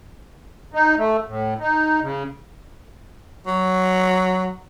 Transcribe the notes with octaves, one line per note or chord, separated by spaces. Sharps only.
D#4
A3
A2
D#4
C#3
F#3